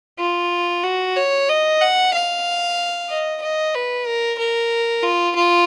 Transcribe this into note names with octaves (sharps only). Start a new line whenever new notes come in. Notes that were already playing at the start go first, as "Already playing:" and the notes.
F4
F#4
C#5
D#5
F#5
F5
D#5
D#5
B4
A#4
A#4
F4
F4